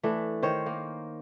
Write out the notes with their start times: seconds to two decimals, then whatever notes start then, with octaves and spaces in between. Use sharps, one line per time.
0.03 E3 A3 D4
0.42 D#3 C5 C#5
0.66 A#3